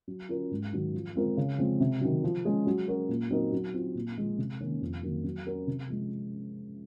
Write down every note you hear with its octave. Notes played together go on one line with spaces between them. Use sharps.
F#3
C#4 F4 A#4
G#2
D#3 F#3
F3
G#3 C4 F4 A#4
C#3
F3 G#3 C4
C3
D#3 F#3
F3
G#3 C#4 G#4
F#3
C#4 F#4 A#4
A#2
F#3 C4 D#4 A#4
F#3
C4 F4
A#2
F3 G#3
C3
D#3 A#3 C#4
F2
D#3 F#3 A#3
F#3
C#4 F#4 A#4
C3
F3 G#3